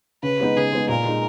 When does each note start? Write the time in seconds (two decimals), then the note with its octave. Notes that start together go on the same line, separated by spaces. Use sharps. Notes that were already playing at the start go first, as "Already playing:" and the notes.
0.23 C#3 B4
0.40 G#3 B3 D#4
0.56 C#3 G#4
0.72 G#3 B3 D#4
0.88 A#2 A#4
1.06 G#3 D#4